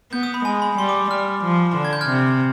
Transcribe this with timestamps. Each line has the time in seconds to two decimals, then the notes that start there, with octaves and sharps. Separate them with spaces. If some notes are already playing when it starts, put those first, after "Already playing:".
0.12 B3 G6
0.23 D#6
0.34 B5
0.45 G#3 G#5
0.62 B5
0.78 G3 C6
0.89 D6
1.11 G3 F6
1.45 F3
1.77 D3
1.85 G#6
1.93 G6
2.01 F6 G#6
2.10 C3